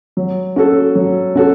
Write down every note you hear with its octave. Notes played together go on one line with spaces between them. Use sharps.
F#3
C#4 F#4 A4
F#3
C#4 F#4 A4